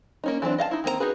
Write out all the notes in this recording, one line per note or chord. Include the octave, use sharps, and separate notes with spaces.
A#3 C#4 D#4
E3 F#3 C4 D4
D#5 F5 F#5 A5
D#4 E4
D#3 A#3 C4 D#4 A#5
D#4 F#4 G#4 B4